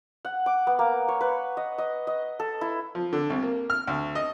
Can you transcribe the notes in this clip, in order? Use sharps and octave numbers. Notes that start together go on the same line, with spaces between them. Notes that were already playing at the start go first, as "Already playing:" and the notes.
F#5
D6
B3
A#3
C#5
B4
D#5
D#5
D#5
A4
E4
F3
D3
C2
A#3
F6
D2
D#5